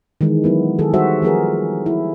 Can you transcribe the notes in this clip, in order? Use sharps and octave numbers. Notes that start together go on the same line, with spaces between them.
D#3 E3 G#3
F#3 B3 E4
D#3 G#4 A4
G3 F#4 C5 E5
F3 B3 G#4 A#4
E4